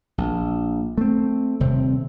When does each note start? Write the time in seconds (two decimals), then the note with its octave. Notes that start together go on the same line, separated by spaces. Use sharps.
0.18 A#1
0.98 A3 C4
1.60 D#1 C3 C4